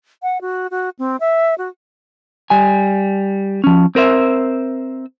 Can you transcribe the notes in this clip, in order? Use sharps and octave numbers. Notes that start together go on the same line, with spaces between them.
F#5
F#4
F#4
C4
E5
F#4
G3 G#5
F3 C#4
C4 A#4 C5 E5